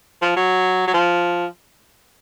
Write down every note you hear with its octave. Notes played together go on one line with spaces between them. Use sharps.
F3
F#3
F#3
F3